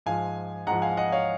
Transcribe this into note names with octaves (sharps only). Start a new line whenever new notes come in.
G#2 F3 F5 G#5
G#2 F3 F#5 A#5
F5 G#5
D#5 F#5
C#5 F5